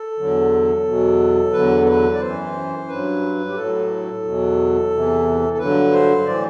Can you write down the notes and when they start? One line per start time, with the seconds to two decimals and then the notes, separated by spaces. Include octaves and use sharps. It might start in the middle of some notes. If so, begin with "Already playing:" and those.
Already playing: A4
0.18 E2 D3 F#3
0.85 E2 B2 F#3
1.53 E2 D3 F#3 B4
1.83 A4
1.87 B4
2.14 D5
2.20 F#2 E3 C5
2.88 G2 F#3 B4
3.49 G4
3.56 A2 F#3 A4
4.23 E2 B2 F#3
4.90 E2 C3 E3
5.53 A4
5.59 G2 D3 F#3 B4
5.92 C5
6.26 A2 E3 D5